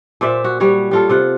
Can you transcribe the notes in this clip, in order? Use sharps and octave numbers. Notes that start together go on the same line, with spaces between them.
A#2 C5 D5 E5
F#4
G3 F#4 C#5
G3 F4 A4
C3 F4 F#5